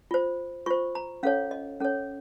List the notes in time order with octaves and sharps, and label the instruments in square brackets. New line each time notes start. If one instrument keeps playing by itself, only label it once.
[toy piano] F4 C5
F4 C5 C#6
A#5
C#4 A4 C#5 F5
D#5
C#4 A4 C#5